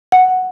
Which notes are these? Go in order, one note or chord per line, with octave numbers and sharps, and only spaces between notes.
F#5